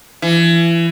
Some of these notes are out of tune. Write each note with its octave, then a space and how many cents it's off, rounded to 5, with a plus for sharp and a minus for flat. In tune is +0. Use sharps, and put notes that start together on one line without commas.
E3 +30